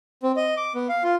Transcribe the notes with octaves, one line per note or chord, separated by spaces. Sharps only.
C4
D#5
D6
B3
F5
F4